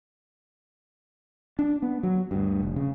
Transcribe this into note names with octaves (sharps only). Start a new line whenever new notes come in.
D4
B3
F#3
D2 G2
F1
C#3